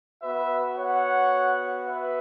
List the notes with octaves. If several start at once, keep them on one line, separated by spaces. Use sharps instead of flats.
B3 F#4 B4 E5
C#5 F#5
B4 E5